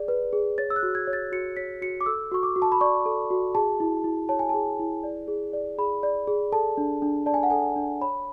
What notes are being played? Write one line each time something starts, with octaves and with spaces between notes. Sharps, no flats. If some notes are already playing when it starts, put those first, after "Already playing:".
Already playing: G#4 D5
B4
G#4
C#5 A6
E6
F#6
F#4
G#6
C#5
A6
F#4 C#7
C#5 B6
F#4 C#7
D6
A4 E6
F#4 C#6
D6
F#4
A5
B5
D5 C#6
A4
F#4
G#4 A5
E4
E4
C#5 A5
G#5
G#4 A5
E4
D5
G#4
D5
G#4 B5
D5
G#4
A4 A5
D4
D4
D5 A5
G#5
F#5
A4 G#5
D4
C#5 B5